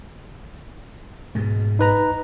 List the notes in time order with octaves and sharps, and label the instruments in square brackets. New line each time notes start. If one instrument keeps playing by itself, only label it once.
[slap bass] G#2 B2 G#3
[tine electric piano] D#4 B4 A#5